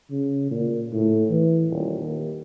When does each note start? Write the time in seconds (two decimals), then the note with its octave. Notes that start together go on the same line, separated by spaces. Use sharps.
0.11 C#3
0.51 A#2
0.92 A2
1.30 E3
1.69 D#1
2.00 D#2